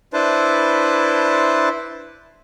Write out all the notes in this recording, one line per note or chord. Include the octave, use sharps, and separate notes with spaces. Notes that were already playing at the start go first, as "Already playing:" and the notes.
D4 E4 B4 C5 A5